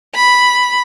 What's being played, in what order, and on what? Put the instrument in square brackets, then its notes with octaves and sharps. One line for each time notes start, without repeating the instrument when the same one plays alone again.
[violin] B5